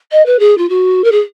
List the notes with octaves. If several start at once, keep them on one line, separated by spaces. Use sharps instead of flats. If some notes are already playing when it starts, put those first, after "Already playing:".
D#5
B4
G#4
F4
F#4
A#4
G#4